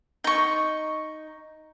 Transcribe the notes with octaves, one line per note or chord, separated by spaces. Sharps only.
D#4 C#6